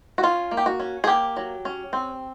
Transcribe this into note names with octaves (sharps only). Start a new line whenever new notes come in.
F#4
C#4 F4
A#3
G4
F#4
C#4
G#4
A#3 G4
F#3
C#4
C4